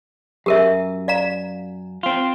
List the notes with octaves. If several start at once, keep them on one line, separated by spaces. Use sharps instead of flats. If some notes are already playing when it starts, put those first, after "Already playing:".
F#2 G4 A#4 E5
D5 F5 A#5
C4 F4